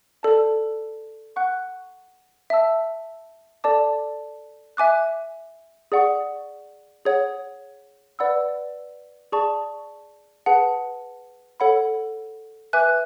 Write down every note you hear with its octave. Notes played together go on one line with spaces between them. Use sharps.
A4 D5 A5
F#5 C#6 F#6
E5 A5 E6
A4 D5 A5 D6
E5 G#5 D6 F#6
G#4 D5 F#5 C#6
G#4 C#5 F#5
B4 D5 F#5 B5 E6
G#4 D5 A5 C#6
G#4 B4 F#5 A5
A4 C#5 F#5 B5
B4 E5 G#5 D6 F#6